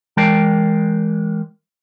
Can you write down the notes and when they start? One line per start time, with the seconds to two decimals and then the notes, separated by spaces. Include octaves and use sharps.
0.17 E3 G#3 A#4 D5 G5 A5